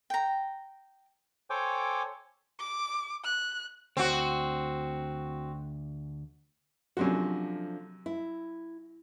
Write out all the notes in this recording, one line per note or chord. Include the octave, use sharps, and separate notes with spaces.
G5 A#5
A4 C5 C#5 G5 G#5 D6
D6
F#6
D2 C4 F#4
F#2 C3 F3 A3 D4 F#4
E4